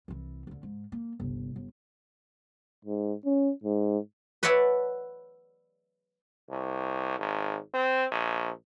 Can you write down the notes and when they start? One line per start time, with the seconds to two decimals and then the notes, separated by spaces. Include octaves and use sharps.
0.08 C2 E3
0.47 D2 D3
0.63 G#2
0.92 A#3
1.20 G1 C2
1.56 G1
2.85 G#2
3.26 C#4
3.64 G#2
4.43 B4 C#5 D5 E5 F#5 A5
6.49 C2
7.19 G#1
7.74 C4
8.11 A#1